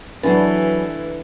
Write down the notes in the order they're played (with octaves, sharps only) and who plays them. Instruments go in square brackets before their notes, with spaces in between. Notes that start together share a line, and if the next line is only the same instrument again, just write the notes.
[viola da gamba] E3 [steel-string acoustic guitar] F#3 G#5 [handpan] D4 B4 [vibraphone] A4